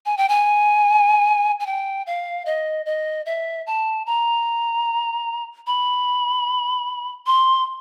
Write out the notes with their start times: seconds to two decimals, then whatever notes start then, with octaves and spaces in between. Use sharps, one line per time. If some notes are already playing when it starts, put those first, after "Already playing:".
0.06 G#5
0.17 G5
0.29 G#5
1.60 G#5
1.66 G5
2.07 F5
2.46 D#5
2.86 D#5
3.26 E5
3.67 A5
4.06 A#5
5.67 B5
7.27 C6